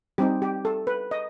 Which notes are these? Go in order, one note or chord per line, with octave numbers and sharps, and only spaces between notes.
G3 C4 D#4 G4
G4
A4
B4
D#5